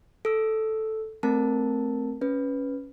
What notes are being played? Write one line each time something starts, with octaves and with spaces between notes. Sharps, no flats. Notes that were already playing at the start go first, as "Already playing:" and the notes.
A4 E6
A3 C4 A#4 A5
C#4 B4